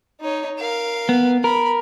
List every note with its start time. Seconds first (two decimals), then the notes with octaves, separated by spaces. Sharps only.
0.21 D#4 C#5
0.59 A#4 F5
1.09 B3
1.44 A#4 B5